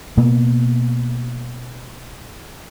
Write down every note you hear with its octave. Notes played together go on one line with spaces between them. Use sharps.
B2 A#3 B3